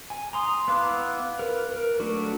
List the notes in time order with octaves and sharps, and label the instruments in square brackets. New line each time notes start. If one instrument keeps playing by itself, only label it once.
[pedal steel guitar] G#5
A#5 C6 D#6
B3 E4 F5 D6 F#6
A#4 B4
A#4
F#3 A3 D4 F#4